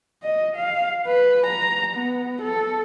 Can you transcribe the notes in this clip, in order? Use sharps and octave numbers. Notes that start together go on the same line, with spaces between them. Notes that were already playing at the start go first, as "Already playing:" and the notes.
D#5
F5
B4
A#5
B3
A4